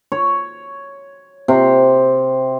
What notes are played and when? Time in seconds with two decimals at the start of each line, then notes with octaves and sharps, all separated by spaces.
0.12 C#5
1.48 C3